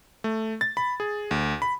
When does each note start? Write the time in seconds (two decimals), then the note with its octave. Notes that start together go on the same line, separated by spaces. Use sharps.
0.24 A3
0.61 A6
0.77 B5
1.00 G#4
1.31 D2
1.62 B5